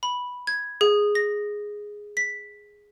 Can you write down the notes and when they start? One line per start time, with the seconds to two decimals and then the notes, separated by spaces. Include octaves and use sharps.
0.03 B5
0.47 G#6
0.81 G#4
1.15 A#6
2.17 B6